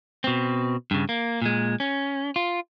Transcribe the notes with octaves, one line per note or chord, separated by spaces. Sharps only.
B2 C4
G2 C#3
A#3
A#2 G#3
C#4
F4